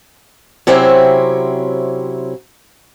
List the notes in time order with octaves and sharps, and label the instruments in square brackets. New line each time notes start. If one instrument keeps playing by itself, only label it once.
[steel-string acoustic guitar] C3 F#3 C4 C#4 E4